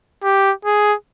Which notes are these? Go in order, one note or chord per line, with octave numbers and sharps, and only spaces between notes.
G4
G#4